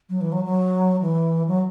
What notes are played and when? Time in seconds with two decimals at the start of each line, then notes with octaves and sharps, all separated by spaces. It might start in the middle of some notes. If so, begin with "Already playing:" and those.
0.10 F#3
0.21 E3
0.32 F#3
0.44 F#3
1.01 E3
1.48 F#3